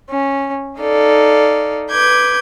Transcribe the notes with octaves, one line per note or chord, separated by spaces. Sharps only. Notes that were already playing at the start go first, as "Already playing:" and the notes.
C#4
D#4 A4 D5 F5
B4 D6 G6 G#6